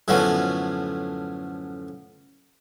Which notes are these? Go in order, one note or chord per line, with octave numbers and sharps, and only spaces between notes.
F#2 A2 D3 F3 B3 C#4